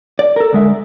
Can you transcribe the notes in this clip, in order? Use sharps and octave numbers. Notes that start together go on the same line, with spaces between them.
D5
A4 A#4
D2 G#3 E5